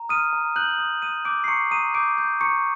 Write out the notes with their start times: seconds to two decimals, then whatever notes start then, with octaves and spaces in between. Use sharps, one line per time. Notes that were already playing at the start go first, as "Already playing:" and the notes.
Already playing: A#5
0.09 D#6 F6 D#7
0.33 A#5
0.56 F#6 G6 F#7
0.78 D#6
1.02 D#6 D#7
1.25 D6 G6 D7
1.44 C7
1.48 A#5 C#6 C#7
1.71 A#5 D#6 D#7
1.94 D6 G6 D7
2.18 G6
2.40 A#5 C#6 C#7